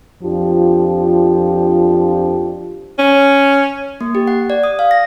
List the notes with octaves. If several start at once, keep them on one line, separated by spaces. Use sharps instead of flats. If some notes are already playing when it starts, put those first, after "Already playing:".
F2 F3 D4 F4 G4
C#4
A#3
G4
F#5
D5
D#6
F5
A#6